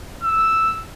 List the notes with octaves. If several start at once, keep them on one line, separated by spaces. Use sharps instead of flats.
E6